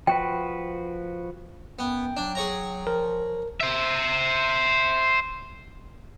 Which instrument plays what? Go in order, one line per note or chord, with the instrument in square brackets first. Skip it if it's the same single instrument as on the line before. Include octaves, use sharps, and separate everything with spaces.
[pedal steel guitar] F3 F#4 B4 [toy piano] G5
[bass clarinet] F#2 [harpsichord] B3 [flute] G5
[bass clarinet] F#3 [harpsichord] D4
[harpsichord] G#4 C#5 A#5
[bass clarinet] F3 [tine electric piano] A#4
[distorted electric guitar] C5 E5